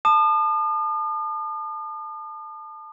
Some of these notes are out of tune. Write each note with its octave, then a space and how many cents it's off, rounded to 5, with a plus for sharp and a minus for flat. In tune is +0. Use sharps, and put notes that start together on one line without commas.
A5 +0 D#6 -45